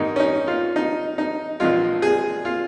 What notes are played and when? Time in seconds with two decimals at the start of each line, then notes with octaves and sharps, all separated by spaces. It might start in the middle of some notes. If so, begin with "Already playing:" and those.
Already playing: G#2 D#3 G#3 D#4
0.16 C#4
0.20 D#4
0.47 F4
0.76 D#4
1.18 D#4
1.60 A#1 A#2 F3 G#3 F4
2.02 G#4
2.45 F4